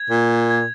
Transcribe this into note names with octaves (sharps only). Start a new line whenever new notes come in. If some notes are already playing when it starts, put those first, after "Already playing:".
Already playing: G#6
A#2
G#6